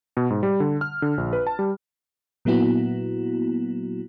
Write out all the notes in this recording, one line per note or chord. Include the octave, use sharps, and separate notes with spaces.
B2
G#2
G3
D3
F6
D3
A#1
B4
A5
G3
A#2 F#3 A#3 B3 E4 F#4